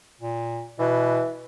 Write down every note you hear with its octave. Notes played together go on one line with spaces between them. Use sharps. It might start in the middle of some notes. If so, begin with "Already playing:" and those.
A#2
B2 E3